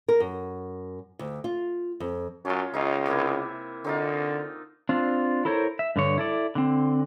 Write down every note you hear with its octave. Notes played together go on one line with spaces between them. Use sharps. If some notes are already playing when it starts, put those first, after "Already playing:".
A#4
F#2
D2
F4
F2
F#2 C#4 F4
C#2 D#4 E5 C6
C3 A#3 E4
D3 C4 D#4 F4
C4 D4 F4
E4 A4 A#4 C5 C#5
E5
G2 D3 C#5
E4 A4 D5
D3 C4